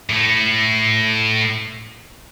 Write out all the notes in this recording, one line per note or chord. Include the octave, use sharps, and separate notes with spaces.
A2 A3